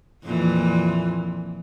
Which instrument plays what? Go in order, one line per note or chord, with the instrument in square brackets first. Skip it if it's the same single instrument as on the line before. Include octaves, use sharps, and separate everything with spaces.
[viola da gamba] F2 A#2 E3